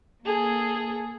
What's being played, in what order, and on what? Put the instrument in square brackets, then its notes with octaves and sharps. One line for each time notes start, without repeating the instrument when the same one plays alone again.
[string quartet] A#3 G#4 A4